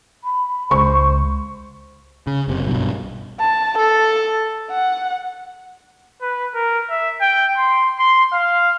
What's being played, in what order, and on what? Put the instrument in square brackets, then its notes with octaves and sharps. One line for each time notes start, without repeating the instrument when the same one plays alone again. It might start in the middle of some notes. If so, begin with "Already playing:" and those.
[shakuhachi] B5
[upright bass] C#2 [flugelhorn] C5 [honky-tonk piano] C#6
[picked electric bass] C#3
F#1 C3
B1 G2 B2
[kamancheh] A5
A4
F#5
[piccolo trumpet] B4
A#4
E5
G5
C6
C6
F5